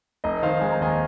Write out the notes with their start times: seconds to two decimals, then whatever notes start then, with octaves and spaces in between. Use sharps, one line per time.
0.24 F1 D#5
0.43 D#3 C5 F5
0.61 G#3 G#5
0.72 A#5
0.80 D#2 D#5 G#5